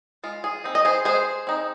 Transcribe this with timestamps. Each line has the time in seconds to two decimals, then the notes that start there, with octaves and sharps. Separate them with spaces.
0.24 G#3 F4
0.44 G#4
0.64 C4 D#4
0.75 D#5
0.85 G#4 C5
1.05 G#3 G#4 C5
1.47 C4 D#4